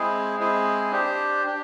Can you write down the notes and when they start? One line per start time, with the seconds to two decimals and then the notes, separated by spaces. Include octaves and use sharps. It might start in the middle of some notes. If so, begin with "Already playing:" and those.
Already playing: G#3 C4 E4 G#4
0.38 G#3 C4 E4 G#4
0.92 D4 G4 C5
1.46 D4 G4